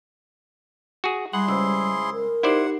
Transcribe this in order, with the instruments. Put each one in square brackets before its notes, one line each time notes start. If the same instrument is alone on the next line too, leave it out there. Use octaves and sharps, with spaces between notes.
[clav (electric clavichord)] F#4 G#4
[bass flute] G3 [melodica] E4 G#4 C6 [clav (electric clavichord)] F#5
[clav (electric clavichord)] C#2 [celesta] C5 E6
[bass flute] A#4
[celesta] D#4 G4 C7 [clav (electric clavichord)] E4 C5 D5 [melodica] F#5